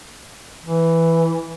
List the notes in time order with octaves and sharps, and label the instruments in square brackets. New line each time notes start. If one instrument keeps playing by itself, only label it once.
[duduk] E3